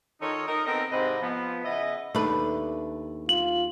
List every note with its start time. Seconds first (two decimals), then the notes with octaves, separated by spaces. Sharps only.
0.22 D#3 D#4 F4 A4 C#5
0.47 D#4 A#4
0.66 B3 C4 D#4 A4 A#4 D#5
0.92 G#2 C3 C4 B4 D#5
1.21 F3 B3
1.64 C#3 B3 E4 D#5
2.15 D#2 A3 D4 B4
3.29 F4 F#7